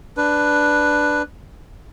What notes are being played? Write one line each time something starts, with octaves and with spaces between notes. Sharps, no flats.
D4 B4